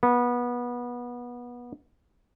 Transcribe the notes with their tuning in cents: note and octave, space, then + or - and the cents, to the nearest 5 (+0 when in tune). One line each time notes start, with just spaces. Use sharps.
B3 -25